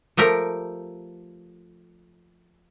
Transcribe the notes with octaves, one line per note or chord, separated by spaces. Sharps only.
F3 A3 G4 A#4